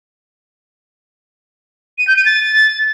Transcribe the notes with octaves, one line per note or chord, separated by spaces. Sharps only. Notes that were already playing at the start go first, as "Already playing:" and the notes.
D#7
G6
D#7
A6